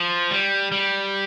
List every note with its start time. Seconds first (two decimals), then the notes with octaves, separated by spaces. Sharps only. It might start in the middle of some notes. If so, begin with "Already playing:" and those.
Already playing: F3
0.31 G3
0.72 G3